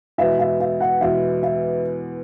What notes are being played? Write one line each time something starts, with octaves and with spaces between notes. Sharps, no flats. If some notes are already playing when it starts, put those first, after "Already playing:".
E2 B2 G#3 B3 E5
E5
E5
F#5
E2 B2 G#3 B3 E5
E5